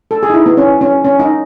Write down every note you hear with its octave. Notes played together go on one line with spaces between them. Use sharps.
A4
G#4
D#4
E4
B3
C#4
C#4
C#4
D#4